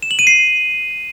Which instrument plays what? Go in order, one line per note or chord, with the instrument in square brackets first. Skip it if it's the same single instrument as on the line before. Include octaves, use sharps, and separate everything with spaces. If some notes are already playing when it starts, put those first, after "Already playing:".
[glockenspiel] E7
F#7
D#7
C7